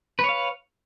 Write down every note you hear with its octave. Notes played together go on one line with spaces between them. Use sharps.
B4 C#5 F5